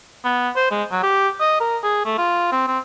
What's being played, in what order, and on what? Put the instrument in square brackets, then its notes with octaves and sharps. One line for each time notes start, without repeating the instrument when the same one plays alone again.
[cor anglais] B3
C5
G#3
F#3
G4
D#5
A#4
G#4
A3
F4
C4
C4